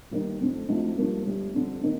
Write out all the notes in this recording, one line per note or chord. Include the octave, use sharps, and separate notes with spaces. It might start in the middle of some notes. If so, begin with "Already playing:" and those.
G1 G2 D#3 A#3
F1 F2 D3
D2 C3 F3 A3 D#4
G2 F3 A#3
G1 G2 D3 G3
F2 D3 G3
C3 D#3 A#3 D#4